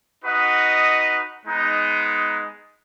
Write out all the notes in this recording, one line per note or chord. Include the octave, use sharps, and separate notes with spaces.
D#4 F#4 B4 D#5 F#5
G#3 B3 D#4